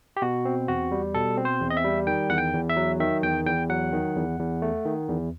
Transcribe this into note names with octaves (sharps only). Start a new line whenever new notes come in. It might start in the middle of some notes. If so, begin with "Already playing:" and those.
G4
B2 F#4
C4
E2 F#4
G3
B2 A4
C4
C5
E2
D#5
E5
G3
D#3 G5
E2 F#5
G5
E2
E5
F#3
D#3 E5
E2 G5
E2 G5
F#3 F#5
D#3
E2
E2
A3
D#3
E2